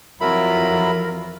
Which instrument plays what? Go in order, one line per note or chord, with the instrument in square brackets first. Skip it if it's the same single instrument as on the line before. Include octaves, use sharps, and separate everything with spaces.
[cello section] F2 E3 F4 [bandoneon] F#3 E4 B5 [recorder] A#4